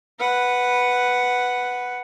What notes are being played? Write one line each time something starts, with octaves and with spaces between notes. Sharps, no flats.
B4 F#5